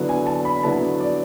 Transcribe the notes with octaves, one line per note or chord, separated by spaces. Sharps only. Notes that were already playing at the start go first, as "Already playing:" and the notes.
Already playing: D3 F#3 B3 E4
G#5
A5
B5
D3 F#3 B3 E4 A5
D5